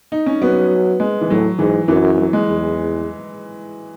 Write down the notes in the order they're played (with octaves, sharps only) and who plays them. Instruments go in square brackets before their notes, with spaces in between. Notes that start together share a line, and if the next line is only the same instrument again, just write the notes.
[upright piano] D#4
C#4
[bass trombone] F#3 [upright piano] B3
[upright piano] G#3
E3
[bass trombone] A2 [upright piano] F#3
[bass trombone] G#2 [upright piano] E3
[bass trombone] F#2 [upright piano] E3
[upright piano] F#3
G#3
[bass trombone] E2